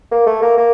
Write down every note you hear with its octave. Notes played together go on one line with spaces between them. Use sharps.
A#3
A3
A#3
A#3